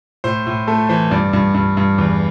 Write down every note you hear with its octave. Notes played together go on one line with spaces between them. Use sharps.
A2 C5
A2
A3 A4
E3 C5
G2 D5
G2
G2
G2
E2